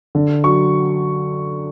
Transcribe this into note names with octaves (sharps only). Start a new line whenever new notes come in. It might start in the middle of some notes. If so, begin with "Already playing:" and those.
D3
F#3 C#6